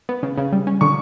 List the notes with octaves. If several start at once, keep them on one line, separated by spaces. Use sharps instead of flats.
B3
C#3
C#3
G3
C#4
D3 C#6